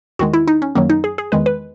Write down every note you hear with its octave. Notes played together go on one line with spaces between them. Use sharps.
E2 D#3 G#3 F#4
E4
D#4
C#4
F#2 D#3 F#3 A#3
D#4
G#4
G#4
E2 D#3 G#3 B4
B4